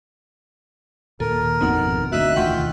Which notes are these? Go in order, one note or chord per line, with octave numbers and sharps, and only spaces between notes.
D#2 A#2 A4 A#4
G#1 F2 B2 C4 D#4 F#5
D2 F#4 D#5 E5 F#6
E1 D2 D#3 F4 F#5 G5 C#6 B6